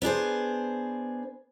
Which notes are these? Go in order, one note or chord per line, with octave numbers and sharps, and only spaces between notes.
B3 D4 G#4 C5